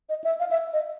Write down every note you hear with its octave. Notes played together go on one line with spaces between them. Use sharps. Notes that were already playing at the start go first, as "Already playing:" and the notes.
D#5
E5
F5
E5
D#5